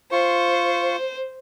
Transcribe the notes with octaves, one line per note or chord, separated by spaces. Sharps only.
F4 C5 C#6